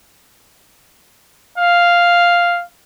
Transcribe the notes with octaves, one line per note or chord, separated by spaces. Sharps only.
F5